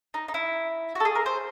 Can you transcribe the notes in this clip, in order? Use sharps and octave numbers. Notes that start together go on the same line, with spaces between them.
D#4
D#4
E4
F#4
A4
G#4
A#4
C5